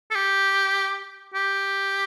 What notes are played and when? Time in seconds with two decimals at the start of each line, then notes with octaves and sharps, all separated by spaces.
0.11 A4
0.15 G4
1.34 G4